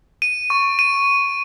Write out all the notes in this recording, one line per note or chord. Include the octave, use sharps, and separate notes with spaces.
D#7
C#6
D#7